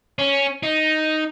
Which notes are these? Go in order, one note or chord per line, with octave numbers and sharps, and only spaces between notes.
C#4
D#4